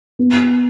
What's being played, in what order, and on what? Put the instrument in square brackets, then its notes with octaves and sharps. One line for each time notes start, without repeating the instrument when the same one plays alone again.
[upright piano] B3